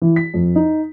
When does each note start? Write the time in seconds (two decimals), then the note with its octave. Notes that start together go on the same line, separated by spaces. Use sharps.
0.02 E3
0.16 B6
0.34 F2
0.56 D#4